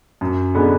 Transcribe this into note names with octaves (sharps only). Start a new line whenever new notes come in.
F#2
D3 G#3 B3